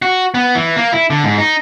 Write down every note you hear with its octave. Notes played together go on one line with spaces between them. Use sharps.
F#4
B3
E3
A#3
E4
D3
G#2
D#4